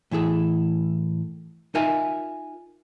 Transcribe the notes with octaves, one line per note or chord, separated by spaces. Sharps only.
A2 E3 E4 G#4 A4
D#4 F4 A#4 E5 G#5